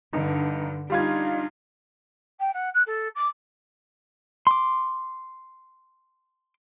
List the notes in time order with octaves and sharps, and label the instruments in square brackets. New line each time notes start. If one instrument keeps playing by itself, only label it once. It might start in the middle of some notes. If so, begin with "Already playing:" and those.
[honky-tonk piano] G2 D#4 [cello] D3
[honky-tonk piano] G3 F4 G#6 [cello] D4 D#4
[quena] G5
F#5
F#6
A4
D6
[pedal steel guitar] C6 D6